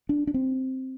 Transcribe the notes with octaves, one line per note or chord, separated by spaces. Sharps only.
D4
D4
C4